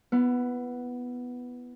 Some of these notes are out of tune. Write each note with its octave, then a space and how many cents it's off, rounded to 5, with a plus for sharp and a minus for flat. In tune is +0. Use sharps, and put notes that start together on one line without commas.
B3 +0 E4 +30